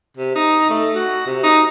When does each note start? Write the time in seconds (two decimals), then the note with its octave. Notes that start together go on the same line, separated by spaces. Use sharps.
0.17 C3
0.35 D#4
0.70 A3
0.95 F#4
1.26 C3
1.43 D#4